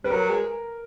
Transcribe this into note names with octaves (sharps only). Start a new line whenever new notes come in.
G3 B4
F#3 A#4
G#3